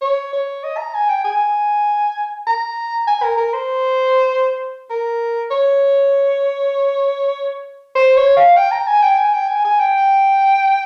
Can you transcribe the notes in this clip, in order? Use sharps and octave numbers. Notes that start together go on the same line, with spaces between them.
C#5
C#5
D#5
A#5
G#5
G5
G#5
A#5
G#5
A#4
A#4
C5
A#4
C#5
C5
C#5
F5
G5
A#5
G#5
G5
G#5
G5
G#5
G#5
G5